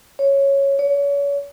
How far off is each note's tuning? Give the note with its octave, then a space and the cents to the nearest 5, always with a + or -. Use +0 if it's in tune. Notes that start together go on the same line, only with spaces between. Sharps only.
C#5 -5
C#5 +35